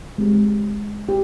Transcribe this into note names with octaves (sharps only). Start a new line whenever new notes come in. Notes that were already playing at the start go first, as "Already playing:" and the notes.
G#3 C4 G4
G4